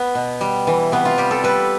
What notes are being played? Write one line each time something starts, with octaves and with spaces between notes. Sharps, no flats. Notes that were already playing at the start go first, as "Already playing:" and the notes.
Already playing: B3
B2
G3
E3
C3 B3
F4
G3 G4
A4
G3 B4